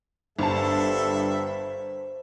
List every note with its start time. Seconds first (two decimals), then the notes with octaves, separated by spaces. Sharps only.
0.39 G1 G2 A4 C5 E5 A5